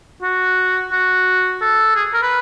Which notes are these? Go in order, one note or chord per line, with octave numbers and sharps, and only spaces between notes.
F#4
F#4
A4
G#4
A#4
B4